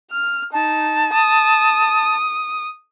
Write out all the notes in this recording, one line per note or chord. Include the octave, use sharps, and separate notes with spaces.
F6
D#4 A5
D#6